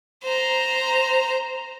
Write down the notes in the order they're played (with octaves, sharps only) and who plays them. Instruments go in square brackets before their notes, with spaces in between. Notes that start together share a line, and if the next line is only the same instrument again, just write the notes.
[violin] C5 A#5